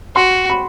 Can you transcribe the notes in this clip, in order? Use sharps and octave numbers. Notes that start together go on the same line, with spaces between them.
F#4 C6
B5